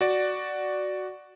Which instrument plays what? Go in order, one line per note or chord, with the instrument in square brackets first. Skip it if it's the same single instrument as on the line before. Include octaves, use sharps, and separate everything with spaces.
[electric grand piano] F#4 D5